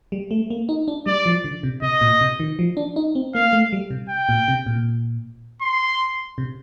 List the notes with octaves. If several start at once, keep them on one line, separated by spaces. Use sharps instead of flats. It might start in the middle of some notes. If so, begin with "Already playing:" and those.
G3
A3
A#3
D#4
D4
G3 D5
F3
D3
C3
C3 D#5
A#2
C3
D#3
F3
D4
D#4
C4
A#3 F5
A3
G3
C3
G5
A#2
C3
A#2
C6
C3